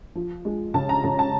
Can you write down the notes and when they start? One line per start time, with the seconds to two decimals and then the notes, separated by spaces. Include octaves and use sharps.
0.15 F3
0.45 G#3
0.74 C#3 A5
0.89 A#5
1.04 C#3 A#5
1.19 A5